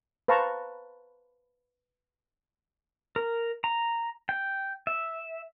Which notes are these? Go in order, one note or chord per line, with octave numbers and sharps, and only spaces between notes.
B4 C5 F5 A5 A#5 C#6
A#4
A#5
G5
E5